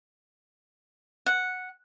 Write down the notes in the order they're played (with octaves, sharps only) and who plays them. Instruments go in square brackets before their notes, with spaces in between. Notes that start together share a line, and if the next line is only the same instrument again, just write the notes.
[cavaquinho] F#5